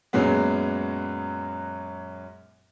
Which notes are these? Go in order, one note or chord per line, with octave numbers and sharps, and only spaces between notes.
F#2 A#2 F#3 G#3 B3